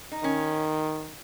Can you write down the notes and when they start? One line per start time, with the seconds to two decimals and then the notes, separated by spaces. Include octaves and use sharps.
0.12 D#4
0.23 D#3 C#4